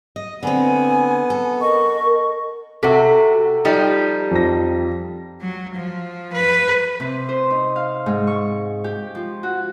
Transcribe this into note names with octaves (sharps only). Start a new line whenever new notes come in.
D#5
D3 B3 C4 G#5
A4
A#4 D#5 C#6
C3 F#4 A4
F3 G3 D#4
F2 A#6
F#3
F3
B4
C3
C5
D#4
F5
G#2
C#6
G4
F3
F#4